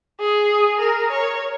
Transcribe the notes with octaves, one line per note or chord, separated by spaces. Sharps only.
G#4
A#4
C#5